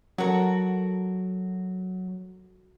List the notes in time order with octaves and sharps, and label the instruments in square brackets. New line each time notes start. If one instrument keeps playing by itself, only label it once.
[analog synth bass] F#3 [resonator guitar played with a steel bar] F#4 A4 A#4